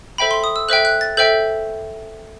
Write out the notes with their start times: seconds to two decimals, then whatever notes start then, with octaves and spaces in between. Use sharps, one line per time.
0.18 A4 C5 E5 G5 B5
0.31 C6
0.44 D#6
0.56 E6
0.68 A4 C5 E5 G5 F#6
0.85 F#6
1.01 A6
1.17 A4 C5 E5 G5 G6